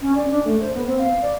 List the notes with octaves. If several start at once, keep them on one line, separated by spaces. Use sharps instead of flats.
C#4
D5
D4
A3
C5
B3
C4
F5
D5